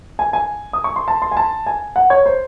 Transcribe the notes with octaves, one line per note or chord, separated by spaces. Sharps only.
G#5
G#5
D#6
C#6
C6
A5
C6
G#5
A5
G#5
F#5
C#5
C5